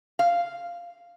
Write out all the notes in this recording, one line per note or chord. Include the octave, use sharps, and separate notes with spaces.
F5